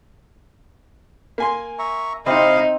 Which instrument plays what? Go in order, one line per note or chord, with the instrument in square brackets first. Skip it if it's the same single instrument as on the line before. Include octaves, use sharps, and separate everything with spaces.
[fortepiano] A#3 G#5 C6
[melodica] E5 A#5 C#6
[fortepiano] C3 [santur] C4 [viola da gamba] D#4 [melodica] E4 D#5 F5